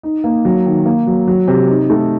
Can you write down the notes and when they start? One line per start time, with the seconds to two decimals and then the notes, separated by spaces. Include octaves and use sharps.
0.03 D#4
0.24 A#3
0.45 F#3
0.66 D#3
0.86 A#3
1.07 F#3
1.28 F#3
1.48 C3
1.69 D#4
1.90 A3